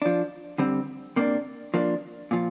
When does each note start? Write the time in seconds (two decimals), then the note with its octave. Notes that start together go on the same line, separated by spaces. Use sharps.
0.02 F3 D4
0.58 D3 G3 C4
1.16 C3 A#3 D4
1.74 F3 A#3 D4
2.31 A#2 F3